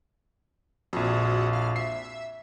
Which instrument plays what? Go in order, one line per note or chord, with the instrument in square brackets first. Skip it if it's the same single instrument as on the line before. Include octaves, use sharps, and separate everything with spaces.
[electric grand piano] A#1 F2 [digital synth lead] F#4
[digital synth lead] F5
[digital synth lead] E5 [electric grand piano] C7